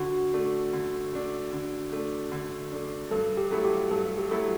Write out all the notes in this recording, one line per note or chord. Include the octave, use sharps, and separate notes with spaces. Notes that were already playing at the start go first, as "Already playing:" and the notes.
Already playing: D3 F#4
A3 D4
D3
A3 D4
D3
A3 D4
D3
A3 D4
G2 A4
G4
F#3 A3 E4 A4
G4
G2 A4
G4
F#3 A3 E4 A4